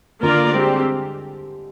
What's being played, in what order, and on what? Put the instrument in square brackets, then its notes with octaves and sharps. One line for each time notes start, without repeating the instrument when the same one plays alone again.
[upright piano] D3 [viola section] A#3 F4 A#4 D5
[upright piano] G#3 [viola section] C4 G4
[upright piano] G3